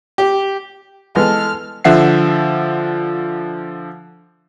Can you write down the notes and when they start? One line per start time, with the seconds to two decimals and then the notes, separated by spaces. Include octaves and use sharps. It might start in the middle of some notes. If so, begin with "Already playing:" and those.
0.18 G4
1.16 E3 G#3 B3 A4 F6
1.84 D3 F3 E5 F#5 C7